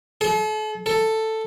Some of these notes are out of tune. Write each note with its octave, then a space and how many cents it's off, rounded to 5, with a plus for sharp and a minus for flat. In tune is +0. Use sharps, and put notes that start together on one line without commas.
A4 -40
A4 +5